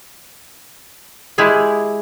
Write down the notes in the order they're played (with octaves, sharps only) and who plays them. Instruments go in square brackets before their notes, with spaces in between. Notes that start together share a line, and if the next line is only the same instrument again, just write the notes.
[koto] G#3 E4 G4 G#4